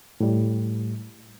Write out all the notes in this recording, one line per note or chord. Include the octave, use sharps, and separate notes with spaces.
A2 G3